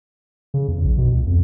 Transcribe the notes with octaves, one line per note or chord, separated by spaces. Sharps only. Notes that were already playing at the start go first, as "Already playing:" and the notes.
C#3
E2
A#1
B2
C#2
F2